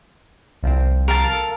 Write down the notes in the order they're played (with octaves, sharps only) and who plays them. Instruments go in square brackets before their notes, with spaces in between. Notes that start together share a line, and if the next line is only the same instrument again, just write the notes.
[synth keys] C2 F3 C4
[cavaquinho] A#4 F5 A5
[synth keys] A4